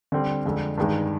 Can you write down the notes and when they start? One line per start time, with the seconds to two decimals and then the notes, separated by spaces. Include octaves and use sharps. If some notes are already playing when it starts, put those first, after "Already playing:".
0.12 D3 G3 C4
0.45 F2 D3 G#3
0.78 G2 D#3 G#3